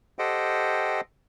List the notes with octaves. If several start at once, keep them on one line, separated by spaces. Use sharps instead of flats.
G4 A4 C5 D#5 F#5 G5